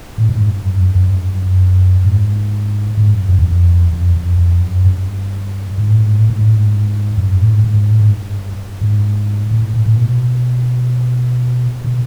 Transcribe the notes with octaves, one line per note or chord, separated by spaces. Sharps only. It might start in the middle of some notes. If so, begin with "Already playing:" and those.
A2
G2
G#2
G2
F#2
G2
F#2
F#2
G2
F#2
G#2
G#2
F#2
F#2
E2
F2
F2
F2
F2
F#2
G2
G#2
A2
G#2
A2
G#2
A2
G#2
F#2
G2
A2
G#2
G#2
A2
G#2
G2
G#2
A2
A2
A2
B2
B2